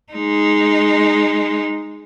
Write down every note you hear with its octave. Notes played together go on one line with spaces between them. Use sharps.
G#3 D#4